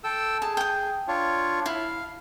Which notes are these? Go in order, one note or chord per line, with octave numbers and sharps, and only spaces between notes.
A4 G5 E6
G#4 A5
G5 D#6
D4 F4 C#5
E4 F5